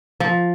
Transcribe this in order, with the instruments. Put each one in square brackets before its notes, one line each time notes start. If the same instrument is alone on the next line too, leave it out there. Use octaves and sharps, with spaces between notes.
[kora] F3